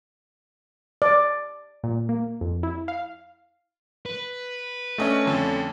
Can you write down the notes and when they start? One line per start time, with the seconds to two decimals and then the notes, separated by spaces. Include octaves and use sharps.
1.02 D5
1.84 A#2
2.09 A#3
2.41 F2
2.63 E4
2.88 F5
4.06 B4
4.98 A3 C#4 D4 D#5
5.25 F2 D3